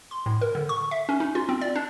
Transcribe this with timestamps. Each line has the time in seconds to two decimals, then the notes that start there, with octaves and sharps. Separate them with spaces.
0.11 C6
0.26 A2
0.41 A#4
0.55 D3
0.69 C#6
0.91 E5
1.09 C#4
1.20 D#4
1.35 F4
1.49 C4
1.61 D5
1.76 D4